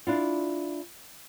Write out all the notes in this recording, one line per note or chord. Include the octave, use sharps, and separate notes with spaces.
D4 E4 F4